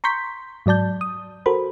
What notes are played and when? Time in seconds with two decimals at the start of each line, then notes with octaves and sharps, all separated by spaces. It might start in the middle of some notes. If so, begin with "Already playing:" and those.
0.04 A#5 C6 C#6 G6 B6
0.66 G#2 F#3 D5 A5 G6
1.01 D#6
1.46 F#4 A4 A#4 C5 B5